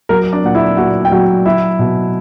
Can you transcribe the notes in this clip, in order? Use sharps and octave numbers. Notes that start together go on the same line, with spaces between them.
F#3 A#4
D4 D5
A#2 F#5
E4 E5
A#2 F#4 F#5
G5
F#3 F#4 F#5
F#3 E4 E5
B2